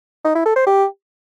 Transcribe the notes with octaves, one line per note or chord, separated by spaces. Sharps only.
D#4
E4
A4
C5
G4